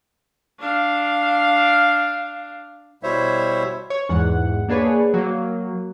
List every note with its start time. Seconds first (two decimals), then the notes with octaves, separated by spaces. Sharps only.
0.60 D4 F5
3.03 B2 G3 E4 C5 C#5 E5
3.90 C#5
4.09 E2 G#2 F#5
4.68 A#3 D4 G#4 B4 C#5
5.14 F#3 A#3